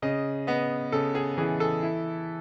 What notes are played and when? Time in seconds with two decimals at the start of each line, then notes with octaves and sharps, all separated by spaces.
0.02 C#3 D#5
0.47 B3 D#5
0.92 C#3 A4
1.15 G#4
1.37 E3 G#4
1.60 A4
1.83 E4